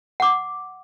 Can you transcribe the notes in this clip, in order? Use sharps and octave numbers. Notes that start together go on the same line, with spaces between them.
F#5 D6